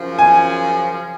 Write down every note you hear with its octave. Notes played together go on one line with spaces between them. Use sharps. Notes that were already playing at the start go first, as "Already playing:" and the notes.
Already playing: F#2 C#3 F3
G#5